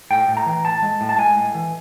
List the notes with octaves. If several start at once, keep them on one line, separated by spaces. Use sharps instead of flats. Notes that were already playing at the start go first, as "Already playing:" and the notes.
A2 G5
A2
A#5
E3
A2 A5
G#3
A2
A5
G#3 G#5
A2
E3